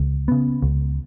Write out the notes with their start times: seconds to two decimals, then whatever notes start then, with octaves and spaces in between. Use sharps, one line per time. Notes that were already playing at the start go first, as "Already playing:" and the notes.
Already playing: C#2
0.28 C#3 B3
0.62 C#2